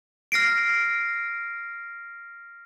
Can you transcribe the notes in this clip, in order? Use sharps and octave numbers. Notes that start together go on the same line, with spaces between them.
F6 A#6 C7 D7